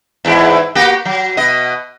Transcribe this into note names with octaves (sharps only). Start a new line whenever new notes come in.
E2 G#2 E4
A#3 F#4 G4
F#3
B2 D#5